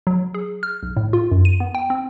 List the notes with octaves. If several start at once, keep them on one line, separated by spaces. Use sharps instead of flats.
F#3
G#4
F6
B1
A2
F4
F#2
D#7
B3
G5
C4